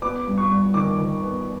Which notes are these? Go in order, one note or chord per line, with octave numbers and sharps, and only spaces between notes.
B3 D6
G2
C#6
G2
D#3 D6
D#3
B3